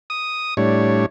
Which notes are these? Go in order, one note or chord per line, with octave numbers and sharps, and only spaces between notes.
D#6
A2 G3 D4 C#5